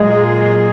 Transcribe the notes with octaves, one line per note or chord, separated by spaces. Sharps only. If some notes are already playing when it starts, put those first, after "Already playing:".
Already playing: A#2 F#3 G#3 A#3 F4 G#4